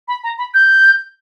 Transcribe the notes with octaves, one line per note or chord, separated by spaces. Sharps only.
B5
A#5
B5
G6